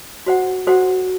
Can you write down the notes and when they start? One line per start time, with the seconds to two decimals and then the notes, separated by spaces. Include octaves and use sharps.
0.26 F#4 C5 F#5
0.67 F#4 A4 C5 F#5